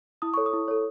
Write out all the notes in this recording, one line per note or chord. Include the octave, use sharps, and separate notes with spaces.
E4 D#6
A4 C#5 C#6
D#6
E4
A4 C#5